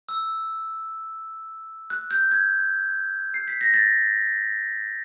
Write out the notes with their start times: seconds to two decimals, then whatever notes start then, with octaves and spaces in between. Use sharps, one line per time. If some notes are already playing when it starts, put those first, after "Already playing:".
0.09 E6
1.90 F#6
2.11 G6
2.32 G#6
3.34 C7
3.48 B6
3.61 A#6
3.74 A6